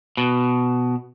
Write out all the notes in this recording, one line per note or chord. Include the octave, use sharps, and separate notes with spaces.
B2